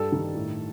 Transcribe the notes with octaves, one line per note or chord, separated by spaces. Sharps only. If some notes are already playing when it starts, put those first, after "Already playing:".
Already playing: G2 G3 A4
D#3
A2